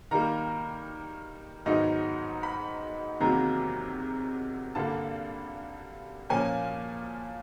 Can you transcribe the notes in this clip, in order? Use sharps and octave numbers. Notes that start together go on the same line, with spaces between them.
D#3 G3 A#3 A#5
G#2 D#3 F#3 B3 D#4
B5
E2 C3 D#3 F#3 A#3 A#5
G2 D3 G3 A#3 A5
A#2 F3 A#3 C#4 G#5